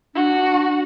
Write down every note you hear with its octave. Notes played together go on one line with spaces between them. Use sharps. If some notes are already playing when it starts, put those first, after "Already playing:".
D4 F#4